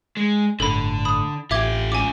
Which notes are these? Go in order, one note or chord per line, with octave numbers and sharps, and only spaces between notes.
G#3
G1 A2 D3 A4 B5
B5 D#6
A1 F4 G4 E5 D6 G#6
C#4 F4 G#5 D6